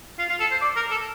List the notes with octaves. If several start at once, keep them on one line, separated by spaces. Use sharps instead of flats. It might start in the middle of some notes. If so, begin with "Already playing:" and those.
F4
F4
A4
C5
D5
A#4
A4